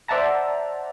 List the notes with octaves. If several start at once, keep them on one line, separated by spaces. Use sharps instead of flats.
C5 D5 E5 F#5 A5 A#5